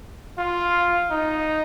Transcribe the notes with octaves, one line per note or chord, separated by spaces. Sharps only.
F4
D#4